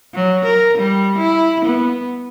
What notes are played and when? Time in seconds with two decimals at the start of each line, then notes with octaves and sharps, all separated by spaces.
0.15 F#3
0.45 A#4
0.78 G3
1.18 E4
1.65 B3